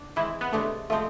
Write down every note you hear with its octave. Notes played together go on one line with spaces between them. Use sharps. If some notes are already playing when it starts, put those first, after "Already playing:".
Already playing: D4
E3 G#3 C4 E4
B3
C3 G#3 A3 D4
F3 G#3 A3 C4